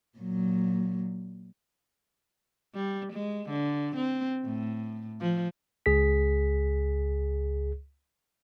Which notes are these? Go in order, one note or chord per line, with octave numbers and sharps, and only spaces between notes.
A#2 F#3
G3
G#3
D3
C4
A2
F3
C#2 G#4 B6